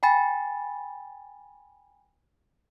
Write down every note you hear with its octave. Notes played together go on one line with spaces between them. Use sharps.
G5 G#5 B5 A6